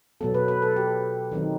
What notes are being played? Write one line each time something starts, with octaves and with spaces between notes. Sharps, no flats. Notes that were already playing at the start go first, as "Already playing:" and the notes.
B2 F#3 B3 A4
B4
B4
A4
G4
D#3 F#3 C4 D#4